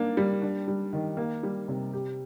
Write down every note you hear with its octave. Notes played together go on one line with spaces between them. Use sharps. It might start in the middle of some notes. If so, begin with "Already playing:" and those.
Already playing: A#3 D4
G3
D4
G3
D#3
A#3
G3
C3
G4